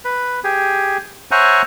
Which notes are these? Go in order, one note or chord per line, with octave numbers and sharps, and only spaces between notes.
B4
G4 G#4
C5 C#5 E5 F#5 G#5 A#5